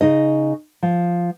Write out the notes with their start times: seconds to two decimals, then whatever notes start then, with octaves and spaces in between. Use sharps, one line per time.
0.01 C#3 D#4 D#5
0.83 F3